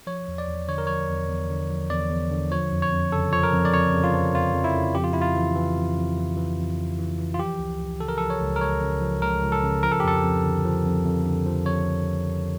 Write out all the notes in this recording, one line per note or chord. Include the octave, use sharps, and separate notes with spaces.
F3 C#5
E2
D5
E2
D3 C#5
A#4
F3 C#5
E2
E2
D3
F3
E2 D5
E2
D3
F3 C#5
F2
C#5
F2
C#3 A4
F3 C#5
A#4
F2
D5
F2 C#5
C#3
F4
F3
F2 F4
F2
E4
C#3
F2 G4
F4
F2 E4
F4
E3
E3
F2
F2
E3
E3
F2
F2
E3
E3
F4
F3 G4
C#2
C#2
C#3 A4
A#4
A4
F3
C#5
C#2
A#4
C#2 C#5
C#3
F3
C#2 A#4
C#2
A4
C#3
F3 A#4
A4
G4
F2 A4
F2
D3
F3
F2
F2
D3
F3
F2 C#5